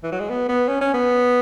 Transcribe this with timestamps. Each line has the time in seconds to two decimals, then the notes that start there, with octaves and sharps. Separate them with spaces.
0.04 E3
0.12 F#3
0.20 G#3
0.30 B3
0.49 B3
0.68 C#4
0.81 C#4
0.94 B3